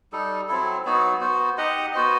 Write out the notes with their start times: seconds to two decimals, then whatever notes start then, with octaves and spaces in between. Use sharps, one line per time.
0.13 G3 D#4 A4
0.48 F#3 C4 E4 A4
0.85 F#3 B3 D#4 F#4
1.21 B3 F#4 C5
1.57 D#4 G4 D#5 F#5
1.93 B3 F#4 C5 D#5